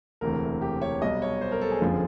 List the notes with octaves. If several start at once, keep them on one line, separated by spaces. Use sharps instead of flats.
E1 D2 C3 E3 A#4
G4
C#5
B1 B2 G3 D#5
C#5
C5
A#4
A4
G#4
F#1 F2 D3 F3